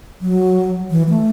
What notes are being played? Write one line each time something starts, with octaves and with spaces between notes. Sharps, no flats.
F#3
E3
A3